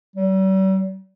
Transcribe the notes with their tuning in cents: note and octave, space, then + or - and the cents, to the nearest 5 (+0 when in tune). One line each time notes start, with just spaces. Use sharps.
G3 -45